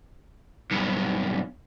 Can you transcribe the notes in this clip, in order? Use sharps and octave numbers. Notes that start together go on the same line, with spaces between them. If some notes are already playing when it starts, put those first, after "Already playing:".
B1 G2